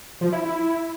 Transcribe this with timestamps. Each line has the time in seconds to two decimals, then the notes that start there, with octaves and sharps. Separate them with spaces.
0.21 F3
0.32 E4
0.44 E4